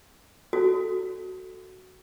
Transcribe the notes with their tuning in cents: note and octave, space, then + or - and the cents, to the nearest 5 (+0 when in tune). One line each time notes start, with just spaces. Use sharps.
F#4 +5 A4 +0